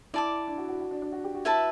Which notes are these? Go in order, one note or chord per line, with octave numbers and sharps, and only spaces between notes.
E4 D5 A5 D6
D4
F#4
F#4
F#4
D4
D4
F#4
G4
F#4
E4 B4 E5 A5